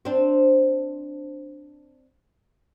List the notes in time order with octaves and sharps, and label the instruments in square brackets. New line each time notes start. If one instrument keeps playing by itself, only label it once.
[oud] C4 D4